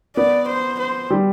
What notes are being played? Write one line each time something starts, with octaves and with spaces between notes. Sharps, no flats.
B3 D5
C5
C5
G3